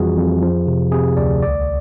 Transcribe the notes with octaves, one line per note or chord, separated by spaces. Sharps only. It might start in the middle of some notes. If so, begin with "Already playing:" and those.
Already playing: F2 E3 G3 F4 F#4 G#4
F2
F3
C3
C3 G#4
D2 D5
C2 D5